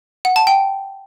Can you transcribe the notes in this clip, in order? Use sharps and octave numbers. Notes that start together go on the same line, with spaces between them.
F#5
A5
G5